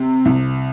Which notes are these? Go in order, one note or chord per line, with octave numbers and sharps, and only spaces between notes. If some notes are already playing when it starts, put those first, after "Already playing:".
Already playing: C3
C2